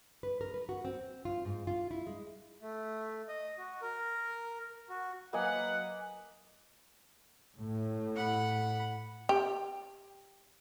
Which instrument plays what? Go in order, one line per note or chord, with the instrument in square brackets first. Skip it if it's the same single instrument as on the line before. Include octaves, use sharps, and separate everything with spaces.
[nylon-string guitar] B4
A#4
B4
F#4
C4
F4
G#2
F4
E4
G#3
[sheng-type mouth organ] A3
D#5
F#4
A#4
F#4
[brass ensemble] F#3 B4 F#5 [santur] A#3 D#5 G#5
[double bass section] A2
[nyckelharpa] F#5 B5
[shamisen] G4